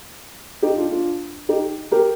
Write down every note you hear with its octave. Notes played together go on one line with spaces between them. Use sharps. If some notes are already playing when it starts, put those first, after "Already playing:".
D#4 G4
D4 F4
D4 F4
D#4 G4
G4 A#4